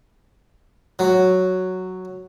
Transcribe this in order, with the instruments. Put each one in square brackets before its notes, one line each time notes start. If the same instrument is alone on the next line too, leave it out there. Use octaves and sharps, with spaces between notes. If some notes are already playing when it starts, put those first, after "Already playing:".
[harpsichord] F#3